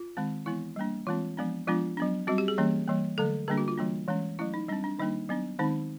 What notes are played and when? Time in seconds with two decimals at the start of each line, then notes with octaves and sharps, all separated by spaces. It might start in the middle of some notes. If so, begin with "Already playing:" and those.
Already playing: F4
0.17 D#3 G#3 C4
0.46 E3 G#3 B3 E4
0.76 G3 A#3 D4
1.07 E3 G#3 C4 F4
1.37 F3 G#3 B3 D4
1.67 F3 G#3 B3 D4 F4
1.97 F#3 B3 D4
2.27 G3 C4 F#4
2.38 G4
2.48 G#4
2.58 E3 G3 A#3 C#4
2.88 E3 G3 A#3
3.18 D3 F#3 A3 A4
3.48 D3 G3 A#3 D4 G#4
3.58 F#4
3.68 F4
3.78 E3 G3 A#3 D4
4.08 E3 G#3 C#4
4.39 F#3 A3 C#4 E4
4.54 D#4
4.68 G3 C4 D4
4.84 D4
4.99 D#3 G3 A#3 D4 D#4
5.29 F#3 B3 D4
5.59 D#3 G#3 C4 D#4